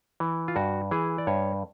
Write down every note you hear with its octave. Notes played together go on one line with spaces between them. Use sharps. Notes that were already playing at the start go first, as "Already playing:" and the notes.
E3
F4
G2 F#4
E3 G#4
D5
G2 C#5